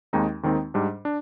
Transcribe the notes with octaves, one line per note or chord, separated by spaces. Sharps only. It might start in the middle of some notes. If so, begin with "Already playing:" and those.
D#2 D#3 G#3 C4 D#4
D#2 D#3 G#3 C4 D#4
G#2 G3 D4
D4